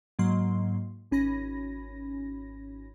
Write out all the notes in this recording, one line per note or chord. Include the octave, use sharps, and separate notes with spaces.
G#2 F#3 A#3 C6
G#1 C#4 B5 A#6